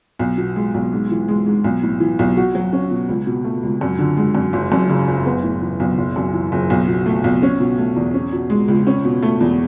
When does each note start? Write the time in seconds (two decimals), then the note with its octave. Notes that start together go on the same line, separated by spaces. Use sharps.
0.19 B1
0.38 B2
0.56 G#3
0.74 B1
0.93 G#2
1.11 E3
1.28 G#3
1.46 G#2
1.64 B1
1.83 A2
2.00 E3
2.19 B1
2.37 F#4
2.55 F#3
2.73 C#4
2.91 B2
3.09 C#2
3.27 B2
3.45 A3
3.63 C#2
3.81 F#2
3.99 D3
4.17 G#3
4.35 F#2
4.53 F#1
4.72 F#2
4.89 C#3
5.07 F#1
5.26 B3
5.43 A2
5.62 E3
5.80 B1
5.98 F#1
6.16 F#2
6.34 E3
6.52 F#1
6.70 B1
6.88 B2
7.06 A3
7.24 B1
7.43 C#4
7.60 B2
7.78 A3
7.96 E2
8.14 C#4
8.32 B2
8.50 G#3
8.68 C#2
8.87 C#4
9.05 B2
9.23 A3
9.40 E2